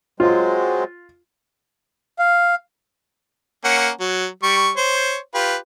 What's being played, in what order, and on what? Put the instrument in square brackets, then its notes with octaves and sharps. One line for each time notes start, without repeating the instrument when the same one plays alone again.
[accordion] F#3 G#3 C4 [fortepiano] F4
[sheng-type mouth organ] F5
[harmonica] A#3 C#4 F#5
F#3
G3 C#6
C5 C#5
F4 G4 B4